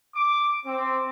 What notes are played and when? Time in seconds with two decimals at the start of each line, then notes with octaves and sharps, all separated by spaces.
0.14 D6
0.65 C4